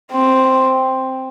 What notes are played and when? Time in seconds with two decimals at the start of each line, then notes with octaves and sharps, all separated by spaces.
0.13 C4